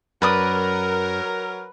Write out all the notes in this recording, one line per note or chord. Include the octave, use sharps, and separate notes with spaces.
F#2 F#3 A#4 B4 D5 D#6